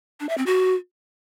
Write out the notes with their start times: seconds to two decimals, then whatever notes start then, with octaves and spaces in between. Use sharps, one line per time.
0.20 D4
0.29 E5
0.38 C4
0.46 F#4